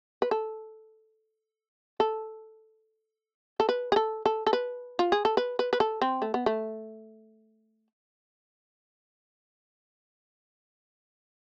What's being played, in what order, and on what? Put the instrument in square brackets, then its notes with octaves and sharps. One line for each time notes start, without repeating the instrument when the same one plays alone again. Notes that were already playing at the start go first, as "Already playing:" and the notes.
[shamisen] B4
A4
A4
A4
B4
G#4
A4
A4
A4
B4
F4
G#4
A4
B4
B4
B4
A4
C4
A3
B3
A3